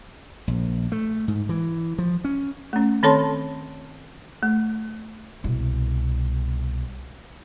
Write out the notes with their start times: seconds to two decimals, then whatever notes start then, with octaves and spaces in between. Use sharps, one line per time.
0.47 A#1
0.92 A3
1.28 G#2
1.49 E3
1.98 F3
2.24 C#4
2.73 A3 C#4
3.03 D#3 C4 A4 C#5 A5 C6
4.43 A3
5.44 C2 B2